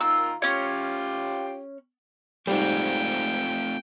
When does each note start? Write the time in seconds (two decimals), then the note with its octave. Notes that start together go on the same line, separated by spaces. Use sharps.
0.01 D#3 F4 A#5 E6
0.42 C#4 F4 G4 C#5
2.47 G#2 G3 A3 C4 F4 G5